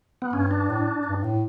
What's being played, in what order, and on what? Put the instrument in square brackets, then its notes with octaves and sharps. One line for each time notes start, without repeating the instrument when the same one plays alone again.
[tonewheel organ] B3
[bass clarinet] G2 [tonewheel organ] C#4
[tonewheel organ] D4
[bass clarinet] A2
G2
A2